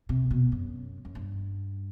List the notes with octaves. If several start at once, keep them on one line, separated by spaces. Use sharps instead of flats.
C3
B2
F#2
F#2
G2